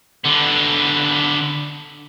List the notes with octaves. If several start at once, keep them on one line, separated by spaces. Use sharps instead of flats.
D3 B3